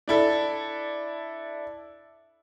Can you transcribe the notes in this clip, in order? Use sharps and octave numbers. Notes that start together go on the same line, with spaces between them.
D4 E4 A4